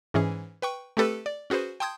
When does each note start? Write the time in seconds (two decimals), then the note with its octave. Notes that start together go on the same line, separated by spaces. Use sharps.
0.14 G#2 E3 C#4 G#4
0.62 B4 G5 C#6
0.97 A3 C4 G4 A4 B4
1.26 D5
1.50 C#4 F#4 G#4 B4 C5
1.80 G5 A5 C6 D#6 G6 G#6